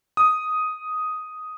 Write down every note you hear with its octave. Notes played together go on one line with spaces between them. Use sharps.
D#6